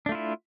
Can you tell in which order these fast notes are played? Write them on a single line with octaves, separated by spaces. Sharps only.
D4 A3 F4 E4